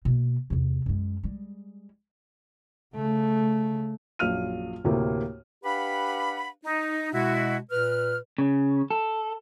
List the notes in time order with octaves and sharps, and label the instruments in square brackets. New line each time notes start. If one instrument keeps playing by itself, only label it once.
[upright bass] B2 A#3
E2 C3
F#2 G#3
G3 G#3
[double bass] C#3 A3
[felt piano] A#1 F#2 F5 F6 D#7
D2 A2 C3 A#3
[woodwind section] D4 G4 B4 F5 F#5 B5
D#4
B2 G#3 E4 F#4
A#2 B4 F6
[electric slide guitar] C#3
A4